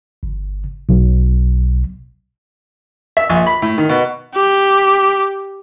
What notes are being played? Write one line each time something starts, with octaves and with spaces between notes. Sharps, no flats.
G1
B1
E5
A#1
B5
A2
D#3
B2
G4